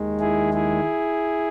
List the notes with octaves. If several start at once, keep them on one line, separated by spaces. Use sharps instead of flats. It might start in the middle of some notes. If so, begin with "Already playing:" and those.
Already playing: D#2 D#3 G#3
E4 G#4
E4 G#4